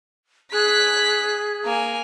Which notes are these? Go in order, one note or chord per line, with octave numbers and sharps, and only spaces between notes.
G#4 F#6 B6
A#3 G#5